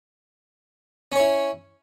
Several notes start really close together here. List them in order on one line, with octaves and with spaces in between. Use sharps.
C#4 C#5 E4